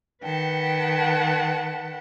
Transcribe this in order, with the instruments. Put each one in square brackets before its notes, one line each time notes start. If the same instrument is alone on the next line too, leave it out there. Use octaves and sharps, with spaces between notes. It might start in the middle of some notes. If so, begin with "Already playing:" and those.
[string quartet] D#3 B4 F#5 G5 A5